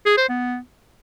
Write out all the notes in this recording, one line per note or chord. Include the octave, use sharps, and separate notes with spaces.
G#4
C5
B3